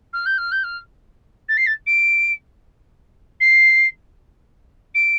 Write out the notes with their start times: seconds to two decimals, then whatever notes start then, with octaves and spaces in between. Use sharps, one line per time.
0.13 F6
0.25 G6
0.38 F6
0.51 G6
0.63 F6
1.48 A6
1.57 C7
1.66 A6
1.86 D7
3.40 C7
4.94 D7